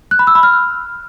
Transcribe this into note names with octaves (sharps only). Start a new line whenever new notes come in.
F#6
B5
E6
B5
F6